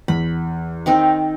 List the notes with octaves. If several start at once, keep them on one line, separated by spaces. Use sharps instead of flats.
E2 B5
D#3 C4 D#4